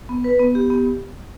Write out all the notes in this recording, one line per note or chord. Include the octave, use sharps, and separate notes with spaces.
B3
B4
B3
G4
B3